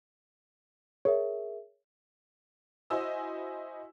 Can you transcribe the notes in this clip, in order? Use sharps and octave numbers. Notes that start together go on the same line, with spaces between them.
G#4 A#4 C#5 E5
E4 F#4 C5 D#5 G#5 E6